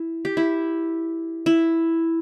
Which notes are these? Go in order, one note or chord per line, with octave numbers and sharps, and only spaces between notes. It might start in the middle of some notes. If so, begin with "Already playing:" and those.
Already playing: E4
G4
E4
E4